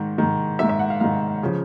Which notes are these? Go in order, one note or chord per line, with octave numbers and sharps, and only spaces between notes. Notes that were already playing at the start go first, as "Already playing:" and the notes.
Already playing: G#2 D#3
G#2 D#3
G#2 D#3 E5
E5
F#5
F5
G#2 D#3 F5
C#3 F3